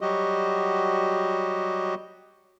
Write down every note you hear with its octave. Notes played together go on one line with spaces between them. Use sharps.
F#3 G3 F#4 G4 D#5